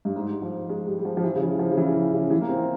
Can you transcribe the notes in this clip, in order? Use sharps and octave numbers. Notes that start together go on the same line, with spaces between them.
G2
G#2
F3
G#3
G3
G3
F3
F3
E3
C#3
E3
F3
C#3
E3
C#3
E3
A#3
C4